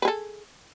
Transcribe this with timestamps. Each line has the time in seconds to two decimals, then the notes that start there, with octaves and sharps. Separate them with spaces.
0.02 B4
0.05 G#4
0.08 A4